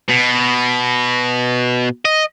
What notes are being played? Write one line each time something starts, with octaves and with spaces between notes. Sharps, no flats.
B2
D#5